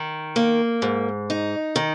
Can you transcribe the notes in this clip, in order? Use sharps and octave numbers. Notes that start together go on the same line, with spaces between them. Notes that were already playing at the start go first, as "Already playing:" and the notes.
Already playing: D#3
A#3
G#2
D#4
D#3